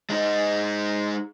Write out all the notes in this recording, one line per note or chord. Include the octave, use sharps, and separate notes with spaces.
G#3 D#4